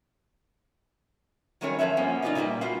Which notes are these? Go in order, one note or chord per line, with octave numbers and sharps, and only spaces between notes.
D#3 F#3 G3 C#4 A#4 C#5
F#2 D#3 F3 C#5 E5
F3 A#3 B3 C#4
D#4 F4 G4 B4 D5 D#5
A#2 D3 E3 G3 A#3
F4 F#4 B4 F5